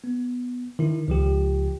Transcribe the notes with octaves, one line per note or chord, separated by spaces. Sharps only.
B3
D#3 E4
C#2 F3 G4